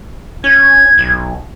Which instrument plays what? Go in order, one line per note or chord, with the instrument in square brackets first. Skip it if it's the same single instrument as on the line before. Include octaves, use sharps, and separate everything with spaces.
[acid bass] C#4 [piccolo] G#6
[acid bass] B1